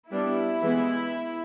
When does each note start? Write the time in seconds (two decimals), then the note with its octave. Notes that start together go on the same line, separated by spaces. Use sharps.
0.11 G3 B3 D4 E4
0.64 E3 G#3 B3